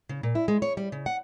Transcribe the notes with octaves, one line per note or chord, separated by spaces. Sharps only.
C#3
A#2
E4
G#3
C#5
G3
C#3
F#5